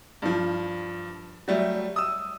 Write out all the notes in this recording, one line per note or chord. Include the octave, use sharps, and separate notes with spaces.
G2 F3
F#3 G3 A3
D#6 E6